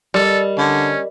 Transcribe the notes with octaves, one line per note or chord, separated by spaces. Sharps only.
G3 A4 A#4 D5 D#5
D3 C#4